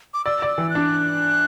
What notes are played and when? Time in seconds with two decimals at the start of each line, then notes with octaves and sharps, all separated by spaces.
0.14 D6
0.25 D5 E6
0.42 D5
0.47 E6
0.58 E3
0.70 F#6
0.75 D4